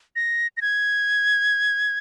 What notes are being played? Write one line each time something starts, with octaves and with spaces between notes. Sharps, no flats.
A#6
A#6
G#6